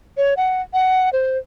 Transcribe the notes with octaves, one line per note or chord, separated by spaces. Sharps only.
C#5
F#5
F#5
C5